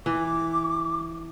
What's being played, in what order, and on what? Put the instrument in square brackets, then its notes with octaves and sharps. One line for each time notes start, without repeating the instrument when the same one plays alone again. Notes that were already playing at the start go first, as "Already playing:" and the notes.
[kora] E3 [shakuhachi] D6